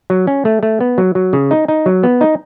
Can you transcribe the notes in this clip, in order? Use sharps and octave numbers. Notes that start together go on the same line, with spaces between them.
F#3
C#4
A3
A3
B3
F#3
F#3
C#3
D#4
D#4
F#3
B3
D#4